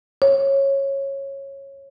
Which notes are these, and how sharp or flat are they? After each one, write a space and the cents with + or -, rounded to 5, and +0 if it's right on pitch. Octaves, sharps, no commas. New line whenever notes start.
C#5 -15